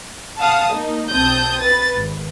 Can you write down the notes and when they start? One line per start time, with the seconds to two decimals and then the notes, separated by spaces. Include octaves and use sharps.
0.40 F5 F#5 A5 D#6
0.74 A#3 D#4
1.11 B1 C4 A5 D#6 G6
1.62 B4 A6
1.96 G#1